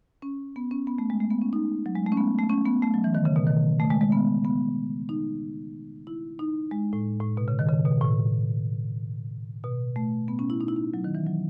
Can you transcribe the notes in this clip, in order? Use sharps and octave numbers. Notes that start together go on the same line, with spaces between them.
C#4
B3
C#4
B3
A3
G#3
A3
B3
C#4
D#4
F#3
G#3
A3
C#4
B3
A3
C#4
B3
A3
F#3
E3
D#3
C#3
B2
D#3
A3
G#3
G#3
B3
B3
D#4
E4
D#4
G#3
A2
A2
B2
C#3
D#3
C#3
B2
A2
B2
A3
B3
C#4
E4
D#4
E4
D#4
F#3
D#3
E3
F#3